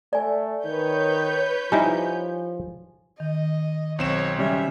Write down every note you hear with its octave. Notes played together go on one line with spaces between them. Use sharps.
A3 D5 G#5
D#3 B4 C#5 G6
F3 G3 D#4 E4 G#5
D#3 D#5
B1 C4 C#5 E7
C#3 G3 C#4 E5